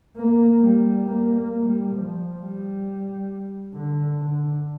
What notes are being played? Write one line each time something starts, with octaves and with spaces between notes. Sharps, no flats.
A#3
G3
A#3
A#3
G3
F3
G3
D3
D3